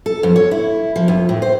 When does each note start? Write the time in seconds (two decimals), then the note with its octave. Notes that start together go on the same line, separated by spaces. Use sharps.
0.06 A4
0.23 F2
0.36 C#5
0.51 E4
0.96 F3
1.08 F2
1.29 A2
1.42 C5